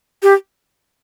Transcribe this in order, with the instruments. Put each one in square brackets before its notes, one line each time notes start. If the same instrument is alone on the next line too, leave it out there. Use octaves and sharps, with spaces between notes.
[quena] G4